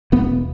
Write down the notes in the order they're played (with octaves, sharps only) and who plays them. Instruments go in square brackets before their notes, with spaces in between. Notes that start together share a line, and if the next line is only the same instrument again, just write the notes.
[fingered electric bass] E1 B3